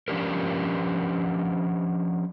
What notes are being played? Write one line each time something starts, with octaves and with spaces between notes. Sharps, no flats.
F3 C#4 D4 G4 A#4